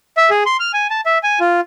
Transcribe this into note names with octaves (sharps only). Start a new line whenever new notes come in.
E5
G#4
C6
F6
G#5
A5
E5
G#5
F4